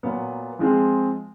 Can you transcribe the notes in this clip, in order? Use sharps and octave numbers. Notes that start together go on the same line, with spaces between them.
A#2 F#3 B3
F3 G#3 C4 F4 G#4